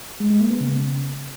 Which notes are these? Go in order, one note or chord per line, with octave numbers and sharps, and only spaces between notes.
G#3
G#3
A#3
B3
C#3